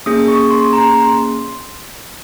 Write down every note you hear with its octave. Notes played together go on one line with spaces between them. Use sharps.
A#3 C#4 G#4 D#6
C#6
C6
A#5
C6